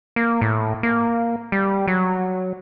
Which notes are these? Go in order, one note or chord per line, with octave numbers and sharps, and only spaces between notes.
A#3
A2
A#3
G3
F#3